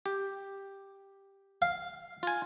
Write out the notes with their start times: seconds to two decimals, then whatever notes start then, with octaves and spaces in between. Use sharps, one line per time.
0.06 G4
1.62 F5
2.23 F4 G#5